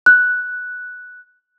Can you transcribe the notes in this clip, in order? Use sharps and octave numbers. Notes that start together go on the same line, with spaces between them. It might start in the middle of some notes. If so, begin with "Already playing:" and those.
F#6